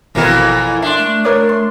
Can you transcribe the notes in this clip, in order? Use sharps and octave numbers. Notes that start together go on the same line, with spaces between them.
G#1 F2 B2 E3 C4 E4 A#4
D4 E5 C6
A3
A3 A#4 C#5 D6
C6